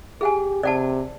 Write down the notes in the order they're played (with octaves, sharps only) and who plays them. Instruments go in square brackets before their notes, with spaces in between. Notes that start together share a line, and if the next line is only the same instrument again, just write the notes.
[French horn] G4 [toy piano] G#4 F#5 G#5
[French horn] C3 [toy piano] D5 F#5 A5